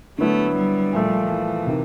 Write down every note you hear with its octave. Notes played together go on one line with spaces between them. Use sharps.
D3 F#3 A3 B3 E4
G3
A#2 F3 A3
E3
C3 D#3